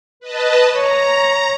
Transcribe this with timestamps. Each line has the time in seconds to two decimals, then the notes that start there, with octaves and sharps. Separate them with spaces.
0.20 B4 D#5 A5
0.76 C#5 A#5